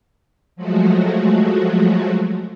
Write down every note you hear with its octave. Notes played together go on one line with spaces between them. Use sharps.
F3 F#3 G#3 A3 F#4